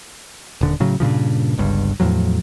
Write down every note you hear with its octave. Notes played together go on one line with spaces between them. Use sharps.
D#1 D3
A2 C#3 F#3
G2 A#2 C#3 F3
G1 C#2 G2
E2 A2 F3 F#3